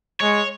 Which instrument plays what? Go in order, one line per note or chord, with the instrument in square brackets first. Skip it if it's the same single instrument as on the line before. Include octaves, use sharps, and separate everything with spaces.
[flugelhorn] G#3 [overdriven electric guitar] C#5